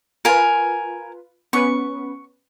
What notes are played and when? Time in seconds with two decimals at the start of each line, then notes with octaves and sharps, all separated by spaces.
0.25 F4 A#4 B4 G#5
1.53 B3 C#4 B4 C#6